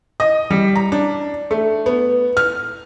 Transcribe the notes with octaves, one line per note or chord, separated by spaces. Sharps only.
D#5
G3
A#5
D4
A3
B3
F6